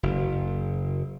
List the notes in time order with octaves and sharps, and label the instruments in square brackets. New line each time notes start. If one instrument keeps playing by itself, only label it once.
[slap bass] F#1